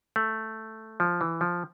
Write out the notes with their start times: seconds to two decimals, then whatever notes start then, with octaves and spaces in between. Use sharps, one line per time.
0.16 A3
1.00 F3
1.21 E3
1.41 F3